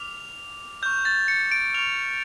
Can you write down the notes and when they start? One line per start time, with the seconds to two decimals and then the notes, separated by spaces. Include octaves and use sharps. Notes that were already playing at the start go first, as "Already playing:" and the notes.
Already playing: D6 F6 F7
0.82 C#6 F6 G6
1.05 A6
1.28 C#7
1.52 D7
1.74 C#6 F6 F7